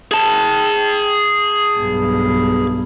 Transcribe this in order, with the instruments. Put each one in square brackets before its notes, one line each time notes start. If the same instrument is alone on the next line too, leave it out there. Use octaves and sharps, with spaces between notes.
[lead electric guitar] G#4 A5
[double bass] B1 G2